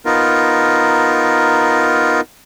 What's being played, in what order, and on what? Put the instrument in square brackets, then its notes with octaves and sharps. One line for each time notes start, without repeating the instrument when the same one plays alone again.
[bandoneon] B3 D#4 F4 A#4